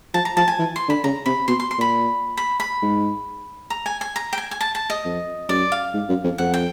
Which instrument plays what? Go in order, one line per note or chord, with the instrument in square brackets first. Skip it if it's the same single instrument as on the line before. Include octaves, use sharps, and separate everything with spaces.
[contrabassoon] F3 [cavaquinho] A5
[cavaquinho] A#5
[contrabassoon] F3 [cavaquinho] A5
[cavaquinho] G#5
[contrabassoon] E3
[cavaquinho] C6
[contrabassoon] D3 [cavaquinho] B5
[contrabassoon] C#3 [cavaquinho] A#5
[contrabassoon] C3 [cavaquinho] B5
[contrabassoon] B2 [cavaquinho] C6
[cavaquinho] C6
C6
[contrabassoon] A#2 [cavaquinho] B5
[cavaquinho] B5
B5
[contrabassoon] G#2
[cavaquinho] A#5
G#5
G#5
A#5
G5
G#5
G#5
A5
A5
D#5
[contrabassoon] F2
[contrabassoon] F#2 [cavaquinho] D5
[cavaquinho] F5
[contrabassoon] G#2
F#2
F2
[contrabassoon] F2 [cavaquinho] F#5
[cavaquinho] G5